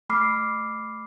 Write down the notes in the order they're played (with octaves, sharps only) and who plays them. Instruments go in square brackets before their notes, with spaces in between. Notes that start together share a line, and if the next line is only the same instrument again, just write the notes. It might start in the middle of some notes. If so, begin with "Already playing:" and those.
[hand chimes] A3 B5 D6 F6 C7